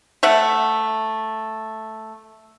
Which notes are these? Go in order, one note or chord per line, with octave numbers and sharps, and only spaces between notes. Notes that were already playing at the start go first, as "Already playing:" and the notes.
A3 E5 F#5